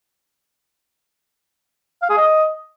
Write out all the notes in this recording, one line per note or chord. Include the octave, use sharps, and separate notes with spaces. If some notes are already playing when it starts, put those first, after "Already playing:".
F5
G#4
D#5